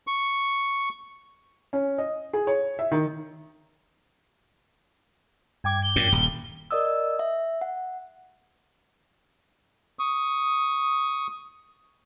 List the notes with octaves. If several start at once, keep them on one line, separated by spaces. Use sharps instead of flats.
C#6
C#4
D#5
G#4
C#5
E5
D#3
G2 G5 D6 G#6
G7
F#2 A#2
D#1
A#4 D5 D#5 D#6 E6
E5
F#5
C#6 D#6